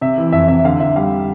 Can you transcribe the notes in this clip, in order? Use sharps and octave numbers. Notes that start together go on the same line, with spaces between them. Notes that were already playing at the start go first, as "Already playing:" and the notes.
C3 E5
E3
F2 E5
C3 E5
D3 F5
D3 E5
G3 F5